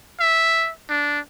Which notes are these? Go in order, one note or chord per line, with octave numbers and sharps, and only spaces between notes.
E5
D4